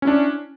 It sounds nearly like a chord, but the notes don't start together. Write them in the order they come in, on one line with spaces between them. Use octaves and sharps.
C#4 E4 D4